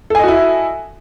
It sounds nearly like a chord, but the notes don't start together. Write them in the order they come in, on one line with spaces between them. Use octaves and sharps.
A4 G#5 D#5 F#4 E4